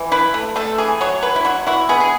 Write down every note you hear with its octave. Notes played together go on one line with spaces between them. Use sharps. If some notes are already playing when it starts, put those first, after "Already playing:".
Already playing: E3
E4 B4
A3
A3 A4
E3 G#4
F#3 C#5
F#3 B4
E4
F#3 F#4
E4 F#4
B3 G#4
G#4